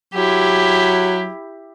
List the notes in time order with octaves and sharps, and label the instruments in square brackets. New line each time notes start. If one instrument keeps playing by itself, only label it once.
[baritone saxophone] F#3 [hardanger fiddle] E4 G4